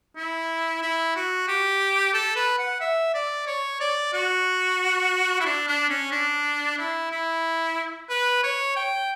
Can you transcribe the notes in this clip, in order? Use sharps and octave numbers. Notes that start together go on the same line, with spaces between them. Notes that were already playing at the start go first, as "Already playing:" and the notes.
E4
E4
F#4
G4
A4
B4
F#5
E5
D5
C#5
D5
F#4
E4
D4
D4
C#4
D4
E4
E4
B4
C#5
G5